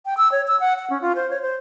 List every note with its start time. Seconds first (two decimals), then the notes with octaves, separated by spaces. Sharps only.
0.06 G5
0.18 E6
0.32 C#5
0.48 E6
0.60 F#5
0.78 F#5
0.90 C#4
1.02 F4
1.15 C5
1.30 C#5
1.42 C5